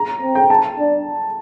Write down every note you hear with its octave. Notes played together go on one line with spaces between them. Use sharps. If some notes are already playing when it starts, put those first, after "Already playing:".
Already playing: A#5
C4
G5
A5
D4